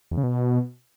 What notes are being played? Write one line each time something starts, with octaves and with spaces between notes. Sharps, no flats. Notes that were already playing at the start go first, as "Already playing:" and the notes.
E2
C#3
B2